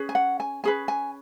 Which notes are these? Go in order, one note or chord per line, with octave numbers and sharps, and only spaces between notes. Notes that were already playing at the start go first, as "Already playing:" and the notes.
Already playing: C#4 G#4 B4
G#5
F#5
G#5
C#4 G#4 B4 G#5
G#5